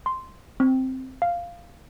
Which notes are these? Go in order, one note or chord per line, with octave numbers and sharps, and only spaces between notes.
C6
C4
F5